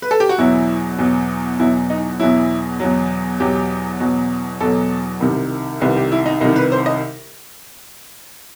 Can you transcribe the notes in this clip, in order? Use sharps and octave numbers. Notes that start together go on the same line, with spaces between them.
B4
A4
G4
F#4
E2 B2 F#3 E4
E2 B2 F#3
E2 B2 F#3 E4
D#4
E2 B2 F#3 E4
E2 B2 F#3
E2 B2 F#3 G4
E2 B2 F#3
E2 B2 F#3 A4
C2 C3 D#3
C2 C3 D#3 B4
G4
E4
D#4
C2 C3 D#3 D#4
B4
C5
D#5